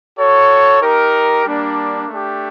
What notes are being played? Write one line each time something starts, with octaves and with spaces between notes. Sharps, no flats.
F#4 A4 C#5
D#4 G4 A#4
G3 A#3 D4
A3 D4 G4